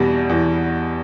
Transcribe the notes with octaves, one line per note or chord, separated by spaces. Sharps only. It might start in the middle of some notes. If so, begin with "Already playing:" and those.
Already playing: E2 B2 G3
E2